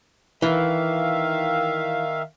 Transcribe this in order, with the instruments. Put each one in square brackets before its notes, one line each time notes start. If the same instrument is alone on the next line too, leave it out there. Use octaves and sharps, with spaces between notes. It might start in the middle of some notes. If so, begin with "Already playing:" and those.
[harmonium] D#3 E5 F5 [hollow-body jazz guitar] E3